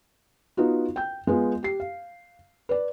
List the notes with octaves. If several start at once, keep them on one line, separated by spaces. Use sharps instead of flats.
B3 D#4 F4 F#4
G5 G6
G#3 B3 F4
G4 C7
F5
B4 D5